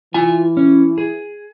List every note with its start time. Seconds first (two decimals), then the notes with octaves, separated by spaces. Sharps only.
0.14 E3 F4 G#5
0.57 C#4
0.98 G#4